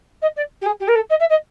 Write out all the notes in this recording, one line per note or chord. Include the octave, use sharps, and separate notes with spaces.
D#5
D5
G4
G#4
G4
A#4
A4
D#5
E5
D#5